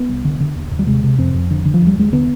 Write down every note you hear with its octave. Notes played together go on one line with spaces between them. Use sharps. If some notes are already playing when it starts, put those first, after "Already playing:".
Already playing: B3
C2
D3
D3
D#2
D#2
G3
C3 G#3
C3
F2 C4
F2
D3
D3
F3
D#2
G3
D#2 G#3
D3 B3